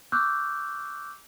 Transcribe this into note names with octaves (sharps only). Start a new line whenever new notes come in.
C#6 D6 E6 F#6 G6